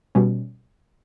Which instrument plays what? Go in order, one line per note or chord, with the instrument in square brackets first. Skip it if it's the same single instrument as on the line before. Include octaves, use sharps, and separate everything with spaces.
[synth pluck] B2 G3 C#4